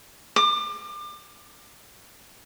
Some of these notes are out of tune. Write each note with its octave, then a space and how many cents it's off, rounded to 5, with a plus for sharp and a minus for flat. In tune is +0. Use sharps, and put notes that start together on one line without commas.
D6 +35